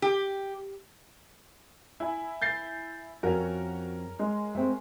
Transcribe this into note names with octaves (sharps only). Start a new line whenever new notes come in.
G4
E4 G#5
G6 A6 C7
F2 C#4 F#4 A#4
G#3
A3 C4